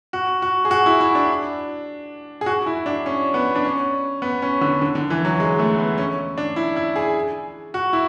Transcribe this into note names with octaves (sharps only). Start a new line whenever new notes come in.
F#4
F#4
G#4
F#4
E4
E4
D4
G#4
F#4
E4
D4
C#4
B3
D4
C#4
B3
C#4
D3
D3
D3
E3
F#3
G#3
A3
B3
C#4
D4
E4
E4
G#4
F#4
E4